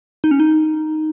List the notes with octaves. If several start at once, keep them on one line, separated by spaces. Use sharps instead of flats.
D#4
C#4
D#4